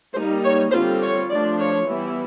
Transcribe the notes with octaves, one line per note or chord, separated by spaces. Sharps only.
G3 A#3 D#4 C5
C#5
D3 G3 C4 F4 C5
C#5
F3 A3 D4 F4 D5
C#5
E3 G3 B3 E4